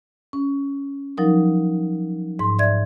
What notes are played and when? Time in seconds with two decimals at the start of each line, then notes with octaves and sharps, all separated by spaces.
0.33 C#4
1.18 F3 F#3 D#4 A#4
2.39 G#2 C6
2.59 D5 E5 G#6